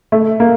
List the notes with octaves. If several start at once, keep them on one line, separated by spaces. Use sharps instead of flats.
A3
A#3